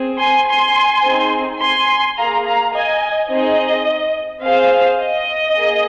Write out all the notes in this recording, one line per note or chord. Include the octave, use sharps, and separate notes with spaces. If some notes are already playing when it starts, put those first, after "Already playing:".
Already playing: C4 G#4
G#5 C6
G#5 C6
C4 D#4 G#4
G#5 C6
A#3 G#4 F5 A#5
F5 A#5
D#5 G#5
C4 D#4 G#4 D#5
C4 G#4 C5 F5
D#5
A#3 G#4